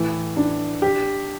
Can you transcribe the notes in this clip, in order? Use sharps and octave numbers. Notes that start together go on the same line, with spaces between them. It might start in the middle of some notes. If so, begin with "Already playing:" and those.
Already playing: A2 E3
D4
G4